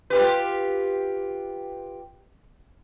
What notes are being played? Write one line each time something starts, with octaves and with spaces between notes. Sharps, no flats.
F4 G4 B4